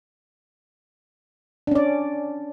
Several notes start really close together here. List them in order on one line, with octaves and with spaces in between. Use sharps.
D4 C#4 D5